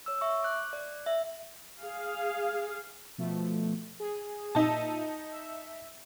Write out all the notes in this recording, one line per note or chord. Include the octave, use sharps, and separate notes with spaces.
C#5 E6
E5 C#6
D6 F#6
D5 F#6
E5
G#4 F5
B2 F3 A3
G#4
A#2 D#4 E5 A5 D#7
E5